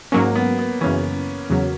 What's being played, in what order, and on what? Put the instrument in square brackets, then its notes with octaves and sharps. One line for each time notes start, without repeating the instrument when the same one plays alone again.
[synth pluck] G#2 F#3 C#4 [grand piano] A#3
[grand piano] B3
B3
[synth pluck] F#2 C#3 E3 [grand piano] C#4
[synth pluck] E2 C#3 F#3